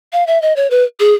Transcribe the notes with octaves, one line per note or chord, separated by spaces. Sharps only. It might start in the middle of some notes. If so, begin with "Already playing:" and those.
F5
E5
D#5
C#5
B4
G#4